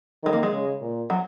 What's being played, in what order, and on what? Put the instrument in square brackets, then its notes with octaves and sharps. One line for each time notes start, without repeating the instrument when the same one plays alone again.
[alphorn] D#3 [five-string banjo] G#3
[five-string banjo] A#3
G#3
[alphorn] C#3
A#2
[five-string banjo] F#3